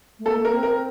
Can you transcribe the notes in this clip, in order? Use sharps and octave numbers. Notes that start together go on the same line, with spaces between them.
A3
A#3 A4
A#3 A#4
C4
A#4